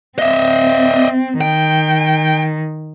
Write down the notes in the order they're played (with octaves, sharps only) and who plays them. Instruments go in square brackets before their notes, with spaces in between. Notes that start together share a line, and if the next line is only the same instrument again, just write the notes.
[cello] C4 [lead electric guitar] D#5 E5
[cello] D#3 [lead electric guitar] G5